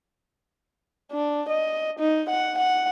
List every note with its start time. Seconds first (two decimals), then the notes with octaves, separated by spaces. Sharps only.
1.12 D4
1.49 D#5
1.99 D#4
2.29 F#5
2.58 F#5